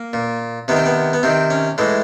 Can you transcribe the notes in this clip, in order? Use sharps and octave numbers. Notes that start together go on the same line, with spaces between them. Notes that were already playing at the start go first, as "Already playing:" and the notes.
Already playing: A#3
A#2
C3 D#3 B3
C4
B3
B3
C3 D#3 C4
C#4
A2 E3 G#3